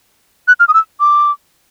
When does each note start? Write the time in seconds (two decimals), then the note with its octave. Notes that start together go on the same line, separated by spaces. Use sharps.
0.48 F#6
0.60 F6
0.68 D#6
0.74 E6
1.00 D6